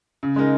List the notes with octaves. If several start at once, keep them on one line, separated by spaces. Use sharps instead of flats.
C#3
G#3 D#4 A#4